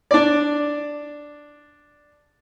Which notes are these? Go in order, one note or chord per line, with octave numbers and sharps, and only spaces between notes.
D4 D5